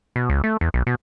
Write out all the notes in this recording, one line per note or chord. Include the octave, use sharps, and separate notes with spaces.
B2
C#2
A3
E2
B1
B2